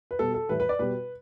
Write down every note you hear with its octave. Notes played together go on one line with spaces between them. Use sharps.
B4
B2 G3 A4
A4
A2 E3 G3 B4
B4
D5
B2 G3 B4